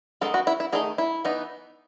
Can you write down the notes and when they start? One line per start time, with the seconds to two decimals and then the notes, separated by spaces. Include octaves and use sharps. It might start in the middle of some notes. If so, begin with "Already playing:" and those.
0.21 D#3 G#3 B3 D#4 A4
0.34 F#4
0.47 E4
0.60 E4
0.73 D#3 A3 D#4 G#4
0.98 E4
1.25 E3 B3 D#4